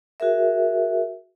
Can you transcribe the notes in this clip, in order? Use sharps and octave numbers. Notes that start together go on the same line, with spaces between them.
F#4 G#4 A#4 E5